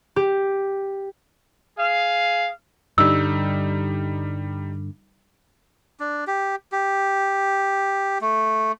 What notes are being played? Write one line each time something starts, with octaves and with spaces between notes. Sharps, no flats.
G4
G#4 F5
G2 D3 G3 D#4 E6
D4
G4
G4
A3